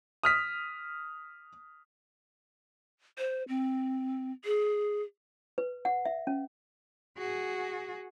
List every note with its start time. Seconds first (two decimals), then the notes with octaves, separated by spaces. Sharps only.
0.23 D#6 F6 B6
3.18 C5
3.48 C4
4.45 G#4
5.58 B4
5.85 F#5
6.05 E5
6.27 C#4
7.18 F#4 G#4